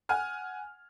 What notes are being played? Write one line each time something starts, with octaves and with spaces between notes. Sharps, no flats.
F#5 G#5 F6